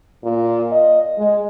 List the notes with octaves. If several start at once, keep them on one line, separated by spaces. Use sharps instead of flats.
A#2
D#5
G#3